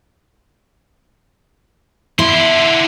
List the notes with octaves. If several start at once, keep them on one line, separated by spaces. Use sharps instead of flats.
D3 E4 C6